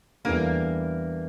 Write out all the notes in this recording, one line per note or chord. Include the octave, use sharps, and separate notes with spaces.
E2 E3 G3 A#3 D4 A4